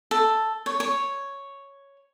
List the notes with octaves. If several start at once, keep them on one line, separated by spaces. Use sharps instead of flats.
A4
C#5
C#5